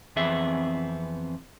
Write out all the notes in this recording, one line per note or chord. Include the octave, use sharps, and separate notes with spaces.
F2 E3 B3 C4 G#4 E5